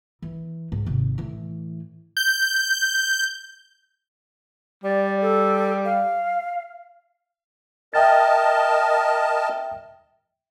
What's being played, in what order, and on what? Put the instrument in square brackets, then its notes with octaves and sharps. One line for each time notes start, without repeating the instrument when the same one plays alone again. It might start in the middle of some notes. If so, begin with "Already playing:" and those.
[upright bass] E3
G#2
G#1 C3
A2 E3
[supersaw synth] G6
[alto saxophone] G3 [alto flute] D5
[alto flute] A4
F5
[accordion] A#4 D#5 A5 [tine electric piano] E5 G5 A6